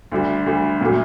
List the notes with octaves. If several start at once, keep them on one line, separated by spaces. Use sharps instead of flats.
D2 D3 G3
D2 D3 G3
A#2 F#3 A3